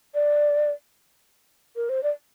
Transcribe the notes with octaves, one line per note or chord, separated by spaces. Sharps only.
D5
A#4
C5
D5